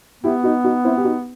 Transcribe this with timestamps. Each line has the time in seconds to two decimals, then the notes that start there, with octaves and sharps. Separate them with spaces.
0.23 B3 E4 G4
0.44 D#4 F#4
0.64 D#4 F#4
0.84 C4 E4
0.97 G4
1.04 D#4 F#4